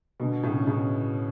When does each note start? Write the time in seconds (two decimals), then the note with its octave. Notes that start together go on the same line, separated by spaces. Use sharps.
0.20 B2 D3
0.43 A2 C#3
0.67 A2 C#3